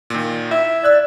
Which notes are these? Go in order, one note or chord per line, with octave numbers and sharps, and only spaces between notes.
A#2 D#3
E4 E5
D5 E6 F#6 G#6